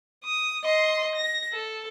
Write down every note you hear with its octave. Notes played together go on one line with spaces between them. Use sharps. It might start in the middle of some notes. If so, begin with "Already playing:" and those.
D#6
D#5 C6
A#6
A4